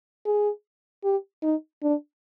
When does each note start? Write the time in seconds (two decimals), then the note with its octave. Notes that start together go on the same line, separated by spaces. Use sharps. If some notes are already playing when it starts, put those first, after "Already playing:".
0.26 G#4
1.04 G4
1.43 D#4
1.82 D4